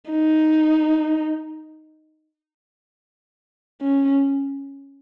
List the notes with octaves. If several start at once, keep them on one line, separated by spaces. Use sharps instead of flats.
D#4
C#4